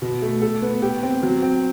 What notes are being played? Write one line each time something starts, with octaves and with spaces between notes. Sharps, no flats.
B2
A3
A4
B3
G4
C4
F#3
C4